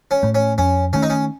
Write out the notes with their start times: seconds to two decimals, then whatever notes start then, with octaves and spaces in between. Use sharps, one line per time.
0.11 C#4
0.23 A2 A3
0.35 C#4
0.58 F2 C#4
0.93 D#3 A3 C#4
1.03 D#4
1.10 C#4